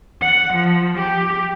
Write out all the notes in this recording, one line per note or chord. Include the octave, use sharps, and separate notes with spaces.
F#5
F3
G4